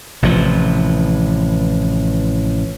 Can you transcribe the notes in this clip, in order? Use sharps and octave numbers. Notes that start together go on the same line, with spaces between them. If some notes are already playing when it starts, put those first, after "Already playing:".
A1 C3 E3 F3